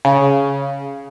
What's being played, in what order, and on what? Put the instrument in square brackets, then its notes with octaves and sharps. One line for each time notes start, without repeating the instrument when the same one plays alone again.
[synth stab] C#3